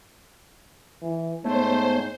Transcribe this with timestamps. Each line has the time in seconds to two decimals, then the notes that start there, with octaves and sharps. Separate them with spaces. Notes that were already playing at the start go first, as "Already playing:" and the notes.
1.03 E3
1.44 G#2 A3 B3 C5 C#5